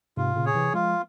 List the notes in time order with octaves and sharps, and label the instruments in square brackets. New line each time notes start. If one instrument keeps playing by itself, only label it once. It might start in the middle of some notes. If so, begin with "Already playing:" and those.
[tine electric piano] G#2 C3 [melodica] F4
[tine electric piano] A#2 C#3
[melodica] G#4 C#5
[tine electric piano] C3 E3
[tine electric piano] F3 G#3 [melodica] F4